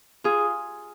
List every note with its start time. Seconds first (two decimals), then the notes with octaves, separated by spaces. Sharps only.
0.24 F4 G#4